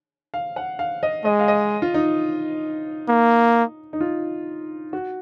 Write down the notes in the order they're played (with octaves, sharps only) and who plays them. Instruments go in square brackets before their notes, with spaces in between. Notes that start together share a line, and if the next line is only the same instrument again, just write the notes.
[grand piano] F5
F#5
F5
D#5
[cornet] G#3 [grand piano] D#5
[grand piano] F5
D#5
F4
D#4
[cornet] A#3
[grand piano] D#4
F4
F#4